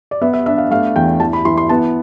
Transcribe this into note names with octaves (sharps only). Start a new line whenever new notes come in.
D5
B3 E5
E5
D4 E5
F5
A3 F5
E2 G5
E3 A5
B5
E3 C6
C6
B3 A5